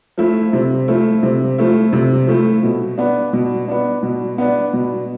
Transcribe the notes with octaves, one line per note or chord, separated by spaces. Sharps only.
F3 A3 E4
C3
F3 A3 E4
C3
F3 A3 E4
C3
F3 A3 E4
B2
B3 D4
B2
B3 D4
B2
B3 D4
B2